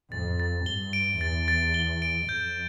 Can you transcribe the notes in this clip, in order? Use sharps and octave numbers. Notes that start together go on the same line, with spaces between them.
F2 A6
A6
G2 G7
D7
E2 A6
A6
G7
D7
F2 G6